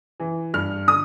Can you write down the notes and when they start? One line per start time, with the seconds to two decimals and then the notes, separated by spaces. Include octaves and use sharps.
0.20 E3
0.54 G2 F6
0.87 D3 D#6